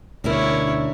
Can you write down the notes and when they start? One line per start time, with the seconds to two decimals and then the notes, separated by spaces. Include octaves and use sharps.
0.24 D2 B2 C#4 D4 E4 A#4 C#5